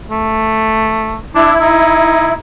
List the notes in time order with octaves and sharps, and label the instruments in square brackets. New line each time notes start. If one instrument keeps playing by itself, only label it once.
[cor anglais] A3
[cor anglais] D4 [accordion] E4
[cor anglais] D#4